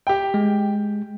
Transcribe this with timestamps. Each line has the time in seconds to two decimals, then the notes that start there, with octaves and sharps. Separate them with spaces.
0.07 G4 G5
0.34 G#3